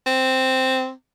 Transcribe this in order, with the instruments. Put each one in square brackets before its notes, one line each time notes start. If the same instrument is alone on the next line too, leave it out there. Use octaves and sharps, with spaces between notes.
[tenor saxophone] C4